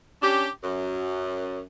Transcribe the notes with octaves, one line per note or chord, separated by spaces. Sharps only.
C#4 D4 G4
F#2